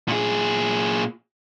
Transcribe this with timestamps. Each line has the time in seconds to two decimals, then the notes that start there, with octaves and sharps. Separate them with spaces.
0.08 A#2 G#4